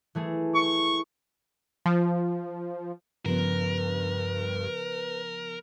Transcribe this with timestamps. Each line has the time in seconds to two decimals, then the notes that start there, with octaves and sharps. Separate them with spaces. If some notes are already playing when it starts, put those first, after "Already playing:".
0.15 E3 A3 G#4
0.55 C#6
1.86 F3
3.26 G2 C#3 F3 B3 A#4 B4